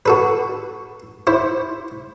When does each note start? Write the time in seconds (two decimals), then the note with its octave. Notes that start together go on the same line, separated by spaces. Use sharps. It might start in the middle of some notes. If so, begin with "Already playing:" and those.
0.06 F#4 A4 B4
1.27 E4 C5